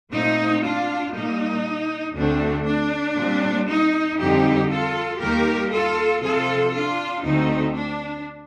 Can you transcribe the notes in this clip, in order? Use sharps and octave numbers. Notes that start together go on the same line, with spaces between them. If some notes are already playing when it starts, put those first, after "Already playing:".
A#2 A3 C4 D#4
D4 F4
A#2 G3 A#3 D#4
D2 D3 A3 C4 D4
D4
A#2 G3 C4
D#4
F2 D3 G3 C4 D#4 G4
F4 A4
D#2 D#3 G3 A#3 G4 A#4
F4 A4
C3 F3 C4 F4 A4
D4 F4
D2 D3 A3 C4 D#4
D4